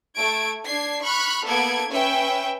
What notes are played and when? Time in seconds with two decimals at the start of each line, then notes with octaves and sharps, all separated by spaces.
0.15 A3 G#6 D7
0.65 D4 G#6 C7
1.01 B5 C#6 F6 F#6
1.45 A#3 B3 A4 G#6 D7
1.89 C#4 B4 E5 G5